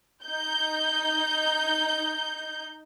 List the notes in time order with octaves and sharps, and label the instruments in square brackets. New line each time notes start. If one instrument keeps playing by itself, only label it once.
[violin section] D#4 G6